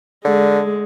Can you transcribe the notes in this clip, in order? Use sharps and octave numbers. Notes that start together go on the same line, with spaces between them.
D3 G#3